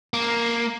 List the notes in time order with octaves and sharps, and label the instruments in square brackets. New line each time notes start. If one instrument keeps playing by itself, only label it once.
[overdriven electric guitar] A#3